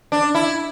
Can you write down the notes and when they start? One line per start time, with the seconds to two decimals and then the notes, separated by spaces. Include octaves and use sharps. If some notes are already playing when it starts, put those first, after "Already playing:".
0.12 D4
0.35 E4